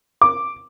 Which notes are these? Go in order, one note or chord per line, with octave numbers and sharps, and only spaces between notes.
D6